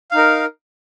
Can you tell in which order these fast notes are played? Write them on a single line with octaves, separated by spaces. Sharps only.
F5 D#4 A#4